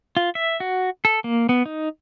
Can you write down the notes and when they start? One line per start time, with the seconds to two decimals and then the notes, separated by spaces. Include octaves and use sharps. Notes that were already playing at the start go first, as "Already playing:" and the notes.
0.17 F4
0.35 E5
0.60 F#4
1.05 A4
1.24 A#3
1.49 B3
1.66 D#4